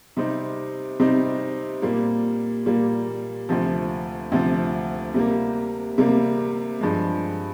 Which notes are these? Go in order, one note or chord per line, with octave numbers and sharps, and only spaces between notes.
C3 G3 C4 D#4
C3 G3 C4 D#4
A#2 G3 A#3
A#2 G3 A#3
D2 C3 F3
D2 C3 F3
C3 G3 A#3
C3 G3 A#3
G2 F3 G#3